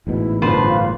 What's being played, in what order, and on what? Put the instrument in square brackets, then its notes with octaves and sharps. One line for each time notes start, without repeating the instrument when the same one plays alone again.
[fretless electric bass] A1 G#2 B2 [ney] E4
[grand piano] G1 A#2 [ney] D4 [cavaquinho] F4 B4 C5
[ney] F5